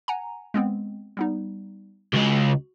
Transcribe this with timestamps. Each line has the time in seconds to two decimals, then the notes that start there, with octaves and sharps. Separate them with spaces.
0.08 F#5 G#5 A#5
0.54 G#3 B3 C4
1.17 G3 B3 D#4
2.13 C#2 G#3 F#4